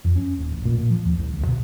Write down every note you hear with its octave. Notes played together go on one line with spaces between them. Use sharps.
F2
C#4
D#1
A1
A#2
A#2
F3
D#2
C2
D2
B2